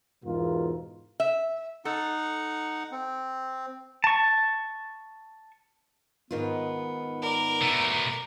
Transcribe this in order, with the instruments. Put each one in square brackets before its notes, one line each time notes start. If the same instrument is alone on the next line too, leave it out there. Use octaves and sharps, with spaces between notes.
[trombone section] E2 G#2 B2 F4 A#4
[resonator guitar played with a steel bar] E5
[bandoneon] D#4 F#5 [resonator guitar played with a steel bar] A4
[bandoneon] C4
[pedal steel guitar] A5 C#6
[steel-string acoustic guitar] G#2 D#3 F4 [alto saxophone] B3
[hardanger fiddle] A#4 D5
[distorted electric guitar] B2 A3